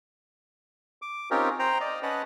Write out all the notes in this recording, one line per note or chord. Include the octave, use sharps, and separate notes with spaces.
D6
C4 C#4 D#4 F4 G4 A#4
C5 G5 A#5
D5 D#5
C#4 B4 D#5 F#5 A5 F#6